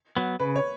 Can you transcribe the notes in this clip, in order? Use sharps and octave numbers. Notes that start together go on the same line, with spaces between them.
F#3 B3
C#3 B4
C#5